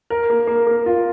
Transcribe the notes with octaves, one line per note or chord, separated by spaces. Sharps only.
A#4
A#3
A#3
A#3
F4